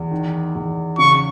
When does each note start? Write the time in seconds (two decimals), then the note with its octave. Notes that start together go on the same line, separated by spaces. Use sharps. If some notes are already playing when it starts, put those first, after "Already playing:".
Already playing: E2
0.11 D#3
0.55 E2
0.98 C#3 C#6